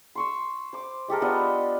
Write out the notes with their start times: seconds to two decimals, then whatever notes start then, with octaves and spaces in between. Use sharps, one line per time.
0.15 C6 C#6 E6
0.73 C5 D6
1.08 G#3 G4 A4 A#4
1.22 B3 D4 F4 D#5